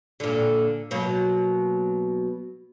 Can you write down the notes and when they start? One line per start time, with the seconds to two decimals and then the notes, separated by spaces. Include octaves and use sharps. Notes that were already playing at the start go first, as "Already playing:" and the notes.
0.20 A#2 D3
0.91 B2 F#3 A#3